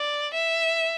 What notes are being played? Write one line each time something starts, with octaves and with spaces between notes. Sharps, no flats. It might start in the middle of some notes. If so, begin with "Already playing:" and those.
Already playing: D5
E5